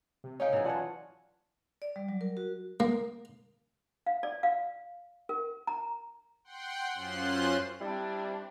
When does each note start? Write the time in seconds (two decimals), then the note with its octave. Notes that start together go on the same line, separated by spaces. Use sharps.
0.24 C3
0.40 C#4 D#4 C#5 F5 G5
0.53 G#2 E3 F#3
0.65 F4 C#5 D5 F#5 G#5 A5
1.82 D5
1.96 G3
2.09 F#3
2.21 A#4
2.37 F#4
2.80 A#3
4.06 F5
4.23 D5
4.43 F5
5.29 A#4
5.67 A#5
6.44 F#5 G5 C6
6.94 F#2 C#4 F4 C5 C6 F#6
7.81 G3 C4 D4 E4